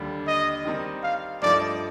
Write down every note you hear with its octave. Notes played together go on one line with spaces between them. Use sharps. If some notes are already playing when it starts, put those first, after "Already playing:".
Already playing: D#2 D3 G3
D#5
D#3 G3 C4 D#4 A#4
F5
G2 F3 A3 D#4 D5